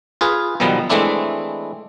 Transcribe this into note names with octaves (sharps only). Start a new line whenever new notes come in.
F4 G#4 B4
B1 B2 D#3 F3 G3 B3
E3 G#3 A3 C4 D4 E4